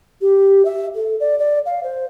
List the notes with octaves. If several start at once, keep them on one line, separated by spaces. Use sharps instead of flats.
G4
E5
A4
D5
D5
F5
C5